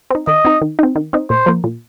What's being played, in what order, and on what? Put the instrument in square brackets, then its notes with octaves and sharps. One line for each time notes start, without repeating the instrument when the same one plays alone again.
[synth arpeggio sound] C4 D#4
[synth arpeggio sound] D#3 [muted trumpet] D#5
[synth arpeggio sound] C4 D#4
D#3
C4 D#4
D#3
C4 D#4
[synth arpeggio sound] A#2 [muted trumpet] C5
[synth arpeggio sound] F3 A#3
A#2